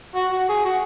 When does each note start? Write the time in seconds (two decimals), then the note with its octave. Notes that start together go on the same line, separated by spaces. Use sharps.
0.15 F#4
0.32 F#4
0.49 G#4
0.65 F#4